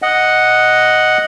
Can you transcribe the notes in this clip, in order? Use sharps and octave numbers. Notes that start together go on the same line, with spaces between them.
D#5 F#5